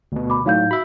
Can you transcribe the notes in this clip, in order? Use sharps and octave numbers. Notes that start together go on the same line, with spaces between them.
D2 B2
B5 D6
A2 F#3 D#4 F5 G6
F#4 E5 B5